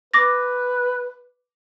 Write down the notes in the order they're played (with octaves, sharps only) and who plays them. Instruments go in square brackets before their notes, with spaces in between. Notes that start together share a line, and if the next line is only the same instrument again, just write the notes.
[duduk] B4 [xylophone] D6 A6 A#6